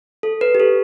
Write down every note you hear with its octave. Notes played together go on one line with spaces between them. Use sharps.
A4
B4
G4
A4